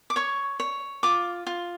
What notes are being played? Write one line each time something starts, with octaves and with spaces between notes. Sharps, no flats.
D6
C#5 C#6
C#5
F4 D6
F4